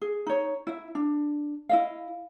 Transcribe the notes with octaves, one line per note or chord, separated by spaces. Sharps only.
G#4
D#4 C#5
E4 E5
D4
E4 D#5 F5